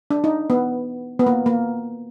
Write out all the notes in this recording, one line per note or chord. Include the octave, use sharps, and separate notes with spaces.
D4
D#4
B3
B3
A#3
A#3